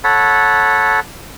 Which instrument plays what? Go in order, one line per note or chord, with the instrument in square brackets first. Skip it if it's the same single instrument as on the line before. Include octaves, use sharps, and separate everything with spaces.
[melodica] A4 C#5 F#5 B5